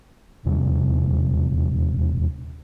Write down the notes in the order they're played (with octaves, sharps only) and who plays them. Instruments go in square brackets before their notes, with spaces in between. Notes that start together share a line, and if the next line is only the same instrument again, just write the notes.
[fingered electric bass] D#1 E2 C3 G3